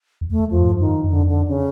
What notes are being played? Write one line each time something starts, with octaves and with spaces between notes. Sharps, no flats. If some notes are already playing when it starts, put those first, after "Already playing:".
E2
A3
E2
F2 F3
G#2
G2
F#2 D#3
F#2
F2 D3
D3
C#3